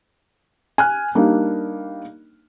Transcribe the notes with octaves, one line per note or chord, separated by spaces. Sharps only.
G#5 F6 F#6
G3 A#3 D4 D#4